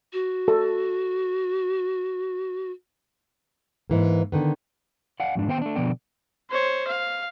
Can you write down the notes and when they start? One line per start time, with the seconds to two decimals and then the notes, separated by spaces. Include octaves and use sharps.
0.13 F#4
0.48 A4
3.90 G#2 E3 A#3
4.32 D3 D#3 B3
5.20 D5 F5 F#5 G#5
5.35 F2 G#2 D4
5.48 D#3 B3 C5 F5 G5
5.62 A3 D4
5.76 B2 D3 F3 B3 D5 G5
6.50 C5 C#5
6.87 F5